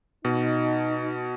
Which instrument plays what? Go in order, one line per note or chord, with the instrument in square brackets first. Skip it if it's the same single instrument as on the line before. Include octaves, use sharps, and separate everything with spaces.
[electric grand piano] B2 [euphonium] D#4